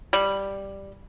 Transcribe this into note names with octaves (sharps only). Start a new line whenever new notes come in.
G3